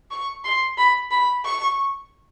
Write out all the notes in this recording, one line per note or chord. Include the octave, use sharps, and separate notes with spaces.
C#6
C6
B5
B5
C#6